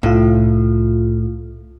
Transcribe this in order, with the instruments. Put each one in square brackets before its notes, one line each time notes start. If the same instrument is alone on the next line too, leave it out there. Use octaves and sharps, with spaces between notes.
[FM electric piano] C2 F4 [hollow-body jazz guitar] A2